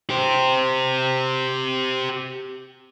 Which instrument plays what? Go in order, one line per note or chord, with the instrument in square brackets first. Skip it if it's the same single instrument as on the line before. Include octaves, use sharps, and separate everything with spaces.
[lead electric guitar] G4 C5